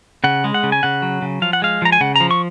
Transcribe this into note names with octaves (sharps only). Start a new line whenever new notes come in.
C#3 F#5
G#3
F#5
C#3
G#5
C#3 F#5
F#3
C#3
F3 F5
F#5
G#3 F5
F3 A#5
G#5
C#3 F#5
F3 A#5
C#6